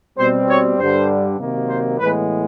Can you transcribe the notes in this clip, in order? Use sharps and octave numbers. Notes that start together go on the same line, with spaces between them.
B2 G3 C4 C5
C#5
G2 D3 G3 C5
C3 D#3 F#3 A#3
C5
A2 E3 G#3 B3 B4